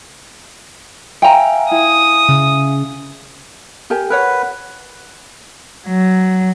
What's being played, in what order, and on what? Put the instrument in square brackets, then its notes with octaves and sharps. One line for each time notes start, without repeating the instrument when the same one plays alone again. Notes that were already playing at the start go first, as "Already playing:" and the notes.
[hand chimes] E5 F5 G#5 [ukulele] G5 A#5
[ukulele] E4 [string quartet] D#6
[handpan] C#3
[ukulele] G4 A#4 G#5
[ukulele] A#4 C#5 F#5 [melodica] B4
[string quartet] F#3